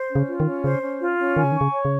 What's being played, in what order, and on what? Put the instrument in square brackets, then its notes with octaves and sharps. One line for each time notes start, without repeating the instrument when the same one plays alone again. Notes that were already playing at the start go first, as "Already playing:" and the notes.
Already playing: [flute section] C5
C#4
[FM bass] C#3
[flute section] F4
[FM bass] D#3
[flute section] C#4
[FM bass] C#3 [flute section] C5
[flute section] C#4
F4
C#4
[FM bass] D#3 [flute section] G#5
[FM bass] C#3
D#3
[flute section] C#6
[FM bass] C#3
[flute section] C#5
[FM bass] C#3